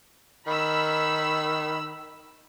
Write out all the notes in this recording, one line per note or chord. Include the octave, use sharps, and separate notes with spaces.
D#3 B5 E6